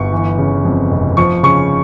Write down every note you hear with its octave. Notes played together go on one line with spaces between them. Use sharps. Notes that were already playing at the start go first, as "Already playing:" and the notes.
Already playing: G1 C#6
E3
C#3
F2
F1
F3 C#6
C#3 C#6